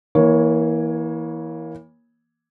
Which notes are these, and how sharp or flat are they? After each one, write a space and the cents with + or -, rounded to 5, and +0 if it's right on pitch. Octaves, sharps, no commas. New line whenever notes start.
E3 -15 A#3 +20 C#5 +0